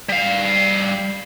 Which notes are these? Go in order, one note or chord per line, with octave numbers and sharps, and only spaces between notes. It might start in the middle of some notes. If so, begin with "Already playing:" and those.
G3 F5